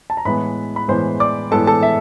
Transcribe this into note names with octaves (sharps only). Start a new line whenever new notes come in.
A5
A#5
A2 E3 G#3 B3 B4 B5
B5
A2 E3 G#3 B3 C5 C6
D5 D6
A2 E3 G#3 B3 A4 A5
A4 A5
E5